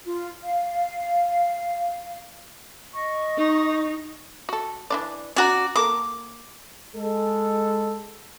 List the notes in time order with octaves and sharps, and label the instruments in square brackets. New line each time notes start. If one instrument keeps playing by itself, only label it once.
[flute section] F4
F5
D#5 C#6
[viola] D#4
[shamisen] F#4 A4
E3 D4 D5
[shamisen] C#4 A#5 [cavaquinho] F#4 D5
[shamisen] A#3 A4 A#4 [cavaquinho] D6
[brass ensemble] G#3 A4